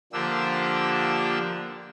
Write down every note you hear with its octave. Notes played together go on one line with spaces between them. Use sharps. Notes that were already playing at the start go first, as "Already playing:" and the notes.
D3 F3 A#3 D4 G4 E6